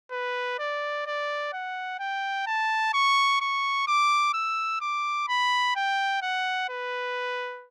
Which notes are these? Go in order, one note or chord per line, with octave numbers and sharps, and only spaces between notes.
B4
D5
D5
F#5
G5
A5
C#6
C#6
D6
E6
D6
B5
G5
F#5
B4